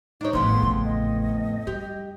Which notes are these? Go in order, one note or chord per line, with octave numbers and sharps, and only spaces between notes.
D4 D#4 C#5
G#1 F2 A2 B3 C4 C6
A1 C#3
D#5
G2 G4